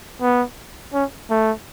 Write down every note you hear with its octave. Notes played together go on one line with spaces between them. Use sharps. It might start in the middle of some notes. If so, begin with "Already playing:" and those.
B3
C#4
A3